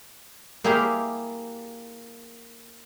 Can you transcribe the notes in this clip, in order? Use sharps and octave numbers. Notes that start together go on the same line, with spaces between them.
A#3 E4 G4 G#4 F5 C6